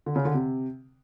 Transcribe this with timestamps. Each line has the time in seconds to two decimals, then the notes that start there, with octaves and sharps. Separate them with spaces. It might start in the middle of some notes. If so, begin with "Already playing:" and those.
0.06 D3
0.16 C#3
0.25 D3
0.34 C3